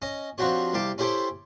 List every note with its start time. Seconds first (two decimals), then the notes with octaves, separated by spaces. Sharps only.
0.02 C#4 D#5
0.38 F3 C4 D4 F#4 G4 C#5
0.73 C2 G4 F5 A5 D6
0.98 C#4 E4 G4 A4 C5 G5